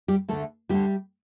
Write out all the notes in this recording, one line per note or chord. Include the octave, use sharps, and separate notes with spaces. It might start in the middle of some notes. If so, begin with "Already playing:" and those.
G3 G4
D2 D3 A3 A4
D2 D3 G3 G4